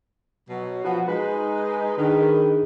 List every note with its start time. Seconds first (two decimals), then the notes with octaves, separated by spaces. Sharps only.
0.50 B2 F#3
0.85 F3 B3 F#4
1.08 G#3 D#4 B4
1.98 D#3 D4 D#4 G#4